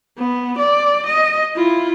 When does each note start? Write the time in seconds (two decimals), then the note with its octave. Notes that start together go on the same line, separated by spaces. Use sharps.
0.18 B3
0.58 D5
1.06 D#5
1.55 E4 F4